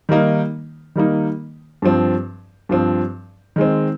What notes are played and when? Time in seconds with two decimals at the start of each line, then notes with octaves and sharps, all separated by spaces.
0.09 D#3 G3 A#3 D#4
0.96 D#3 G3 A#3 D#4
1.82 G2 F3 C4
2.69 G2 F3 C4
3.56 D#3 G#3 C4